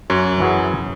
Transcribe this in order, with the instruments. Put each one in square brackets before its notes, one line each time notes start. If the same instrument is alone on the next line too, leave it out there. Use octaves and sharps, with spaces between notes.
[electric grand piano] F#2 [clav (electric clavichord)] C#5
[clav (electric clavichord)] E3 F#3 G#4